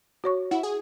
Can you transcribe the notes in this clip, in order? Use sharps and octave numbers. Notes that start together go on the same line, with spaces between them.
F#4 C#5 C#6
E4 F#5
G#4